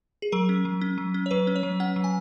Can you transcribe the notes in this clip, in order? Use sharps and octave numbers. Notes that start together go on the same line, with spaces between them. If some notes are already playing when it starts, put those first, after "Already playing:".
G#4
F#3 A#4
C#4
F#3
C#4
F#3
C#4
C#5
F#3 B4
C#4
C#5
F#3
C#4 F#5
F#3
G#5